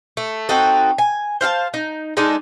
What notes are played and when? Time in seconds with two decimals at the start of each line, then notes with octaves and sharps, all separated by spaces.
0.17 A3
0.49 C4 D#4 F#4 A4
0.98 G#5
1.41 C5 F5 F#5 A5
1.74 D#4
2.17 G#3 D4 D#4 A4